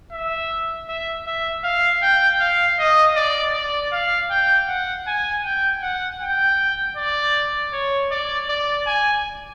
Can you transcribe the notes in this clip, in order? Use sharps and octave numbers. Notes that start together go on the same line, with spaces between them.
E5
E5
E5
F5
G5
F5
D#5
D5
D5
F5
G5
F#5
G#5
G5
F#5
G5
D5
C#5
D5
D5
G#5